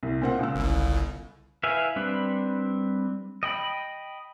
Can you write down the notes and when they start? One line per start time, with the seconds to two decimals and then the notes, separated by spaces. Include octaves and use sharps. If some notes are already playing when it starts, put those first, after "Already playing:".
0.03 C2
0.22 A#2 C4 F#5
0.39 C#2 E6
0.55 G1 C2
1.63 E4 B4 E5 F5 G#5
1.96 G3 C4 D4 B4
3.43 D#5 G5 B5